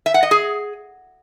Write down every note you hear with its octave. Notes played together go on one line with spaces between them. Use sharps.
E5
F#5
D#5
G#4